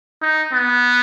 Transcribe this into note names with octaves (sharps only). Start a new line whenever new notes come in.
D#4
B3